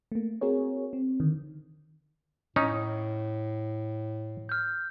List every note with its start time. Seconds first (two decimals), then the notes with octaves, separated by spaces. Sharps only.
0.12 A3 A#3
0.41 C4 F#4 G#4 A#4 C#5
0.93 C4
1.20 D3 D#3
2.56 A2 C#4 D#4
4.49 F6 G6